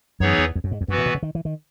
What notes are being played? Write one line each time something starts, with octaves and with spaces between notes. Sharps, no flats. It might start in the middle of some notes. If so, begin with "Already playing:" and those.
F#2 E3 B3 D#4 G#4 C#5
E2
E2
F#2
G#2
E2
F#2 E3 B3 F#4 B4
A2
B2
C#3
D#3
E3
D#3